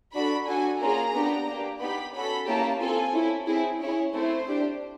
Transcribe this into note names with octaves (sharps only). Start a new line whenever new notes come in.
D4 F#4 A4 B5
D4 F#4 A4 G#5
A#3 C#4 F4 G#4 A#5
B3 D4 G4
A#3 D4 G4
B3 D#4 G4 B5
C#4 F#4 A4 B5
A#3 C#4 E4 G4 A5
C4 F4 A4 G#5
C#4 E4 A4
C4 E4 G#4
C#4 E4 G#4 C#5
A3 C4 E4 C5
D4 G4